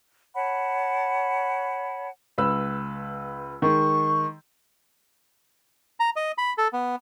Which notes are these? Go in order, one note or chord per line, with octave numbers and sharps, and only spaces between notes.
C#5 F#5 A5 B5
C#2 B4 E6
D#3 G#3 C#6
A#5
D#5
B5
A4
B3